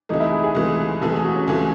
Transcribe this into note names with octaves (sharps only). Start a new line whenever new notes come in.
C#2 C3 E3 A3 D#4
E4
G#4
G#4
C#2 C3 E3 A3
C#2 C3 E3 A3 A4
G#4
F#4
C#4
C#2 C3 E3 A3